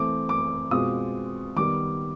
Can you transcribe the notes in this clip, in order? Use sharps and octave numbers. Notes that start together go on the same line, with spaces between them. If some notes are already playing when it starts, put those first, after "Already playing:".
Already playing: E3 A3 C4 D6
D6
B2 G#3 C4 F4 D#6
D#3 G3 B3 D6